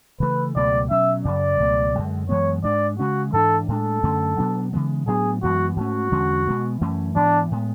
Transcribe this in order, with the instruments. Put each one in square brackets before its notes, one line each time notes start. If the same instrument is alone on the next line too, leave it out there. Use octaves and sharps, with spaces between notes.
[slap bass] C#3 E3 A3 [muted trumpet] B4
[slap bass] C#2 B2 F#3 A3 [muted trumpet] D5
[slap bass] B2 F#3 C#4 [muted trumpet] E5
[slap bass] F#2 C#3 F#3 [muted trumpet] D5
[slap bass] C#2 B2 F#3 A3
F#2 D3 G#3
[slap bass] F#2 E3 G#3 B3 [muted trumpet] C#5
[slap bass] G#2 G#3 D4 [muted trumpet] D5
[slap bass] C#3 G#3 C#4 [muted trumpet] F#4
[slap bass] G#2 E3 B3 D4 [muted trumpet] A4
[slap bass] A2 G#3 D4 [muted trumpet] A4
[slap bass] F#2 D3 A3 C#4
B2 F#3 B3 D4
C#3 E3 G#3 B3
[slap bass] A2 F#3 B3 D4 [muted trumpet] G#4
[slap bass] F#2 E3 G#3 B3 [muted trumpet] F#4
[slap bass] G#2 F#3 [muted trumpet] F#4
[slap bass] A3 C#4
E2 D3 G#3 C#4
B2 G#3 B3
F#2 E3 A3 C#4
[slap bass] G#2 E3 B3 [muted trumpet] D4
[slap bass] A2 G#3 B3